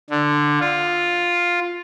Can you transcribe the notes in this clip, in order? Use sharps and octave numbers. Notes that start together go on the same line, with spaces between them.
D3
F4